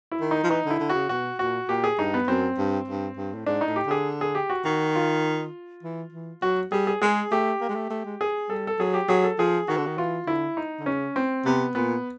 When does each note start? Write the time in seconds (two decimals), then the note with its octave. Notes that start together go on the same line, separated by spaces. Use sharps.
0.11 E4
0.21 D#3
0.31 D#4
0.44 F3
0.50 E3 D#4
0.65 D3
0.70 E4
0.80 D3
0.89 F#4
0.95 C#3
1.09 B2 F#4
1.39 A#2 F#4
1.69 A#2 G4
1.84 G#4
1.99 G2 D#4
2.14 B3
2.28 F#2 C4
2.58 G2
2.88 G2
3.17 G2
3.35 A2
3.46 G#2 D4
3.61 D#4
3.67 A2
3.76 G4
3.86 D3 G#4
4.21 G#4
4.35 G4
4.50 F#4
4.65 D#3 F#4
4.95 F4
5.83 E3
6.12 E3
6.42 F#3 F#4
6.72 G3 G#4
6.87 G#4
7.02 G#3 G#4
7.32 A3 G4
7.61 A#3
7.69 G#3
7.76 A3
7.90 A3
8.05 G#3
8.21 G#4
8.50 G3 A4
8.67 A4
8.79 F#3 G#4
8.94 G4
9.09 F#3 G#4
9.24 A4
9.39 F3 G#4
9.68 D#3 F#4
9.77 D3
9.87 D#3
9.98 E3 F4
10.27 D3 E4
10.57 D#4
10.79 D3
10.86 C#3 C#4
11.16 C4
11.46 C3 B3
11.75 A#2 B3